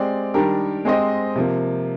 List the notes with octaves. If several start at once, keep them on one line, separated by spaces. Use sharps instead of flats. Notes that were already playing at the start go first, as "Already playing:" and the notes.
Already playing: G#3 C4 G4 D5
D#3 G3 D4 G4 A#4
G#3 C4 G4 C5 D#5
C3 F3 A#3